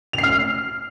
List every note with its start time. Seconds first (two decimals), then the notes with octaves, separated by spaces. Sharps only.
0.13 F7
0.18 C7
0.23 F6